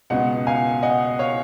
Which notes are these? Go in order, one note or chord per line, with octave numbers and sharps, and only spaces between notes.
C#2 B2 D#5 F#5
F5 G#5
D#5 F#5
C#5 F5